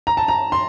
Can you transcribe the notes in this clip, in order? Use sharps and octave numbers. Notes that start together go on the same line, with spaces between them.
A#5
A5
A#5
C6